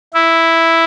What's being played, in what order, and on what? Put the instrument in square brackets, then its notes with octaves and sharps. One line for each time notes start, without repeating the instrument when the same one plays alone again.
[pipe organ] E4